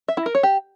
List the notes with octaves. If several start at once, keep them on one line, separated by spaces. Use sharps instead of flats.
E5
E4
A#4
C#5
G4